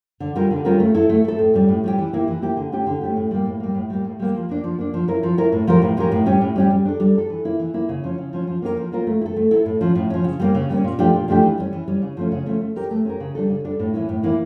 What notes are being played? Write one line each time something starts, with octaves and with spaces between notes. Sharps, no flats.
D3
G3 C#4 F4 A#4
D3
G3 C#4 F4 A#4
A3
E4 A4
A3
E4 A4
A2
G3 C#4 G4
A2
G3 C#4 G4
E3
A#3 E4 G4
E3
A#3 E4 G4
D3
A3 C#4 G4
D3
A3 C#4 G4
A2
G3 A#3
A2
G3 A#3
A2
G3 A#3
A2
G3 A#3
F3
A#3 D4
F3
A#3 D4
F3
C#4 E4 A#4
F3
C#4 E4 A#4
A2
F3 C#4 G4 A#4
A2
F3 C#4 G4 A#4
A2
G3 C#4 G4
A2
G3 C#4 G4
G3
D4 A4
G3
D4 A4
E3
A#3 E4
E3
A#3 E4
C#3
F3 C#4
C#3
F3 C#4
F3
A#3 C#4 F4 A#4
F3
A#3 C#4 F4 A#4
A3
E4
A4
A3
E4 A4
A2
F3 C#4
A2
F3 C#4
C#3
G3 A#3 C#4
C#3
G3 A#3 C#4
A#2
F3 A3 D4 G4
A#2
F3 A3 D4 G4
E3
G3 C#4
E3
G3 C#4
C#3
F3 A3 C#4
C#3
F3 A3 C#4
A3
C#4 G4 A#4
A3
C#4 G4 A#4
C#3
G3 D4 A4
C#3
G3 D4 A4
A2
E3 A#3 C#4 E4
A2
E3 A#3 C#4 E4